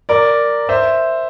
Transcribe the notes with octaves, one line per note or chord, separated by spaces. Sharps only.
A#4 D5
C5 E5